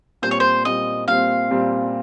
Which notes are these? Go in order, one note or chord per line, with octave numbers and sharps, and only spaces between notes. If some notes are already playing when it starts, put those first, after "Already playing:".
A#2 G3 C4 C5
C#5
C5
A#2 G3 C4 D#5
A#2 G3 C4 F5
A#2 G3 C4